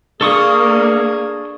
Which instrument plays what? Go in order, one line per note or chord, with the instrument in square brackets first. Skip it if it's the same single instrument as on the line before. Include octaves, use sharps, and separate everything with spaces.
[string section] A#3 [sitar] D4 [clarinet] G#4 [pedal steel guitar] A4 C#6 D#6